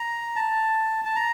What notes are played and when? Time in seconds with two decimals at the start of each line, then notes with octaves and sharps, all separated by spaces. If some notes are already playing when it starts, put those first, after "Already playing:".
Already playing: A#5
0.36 A5
1.05 A5
1.16 A#5